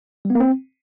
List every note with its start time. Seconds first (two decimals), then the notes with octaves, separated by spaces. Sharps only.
0.25 G3
0.30 B3
0.35 A#3
0.40 C4